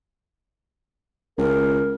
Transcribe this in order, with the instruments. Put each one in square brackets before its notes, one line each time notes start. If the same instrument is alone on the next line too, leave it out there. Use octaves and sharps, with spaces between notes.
[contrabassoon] C#2 [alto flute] A#4